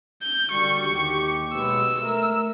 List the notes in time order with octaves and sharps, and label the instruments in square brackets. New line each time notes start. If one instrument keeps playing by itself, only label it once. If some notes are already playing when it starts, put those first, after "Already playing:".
[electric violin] G6
[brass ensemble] D3 G3 F#4 [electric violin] C#6
[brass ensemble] D#2 G4 [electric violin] C#6
[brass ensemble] B1 G#3 B3 [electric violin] E6
[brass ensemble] A3 A#4 E5